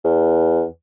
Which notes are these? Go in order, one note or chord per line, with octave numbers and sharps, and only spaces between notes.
E2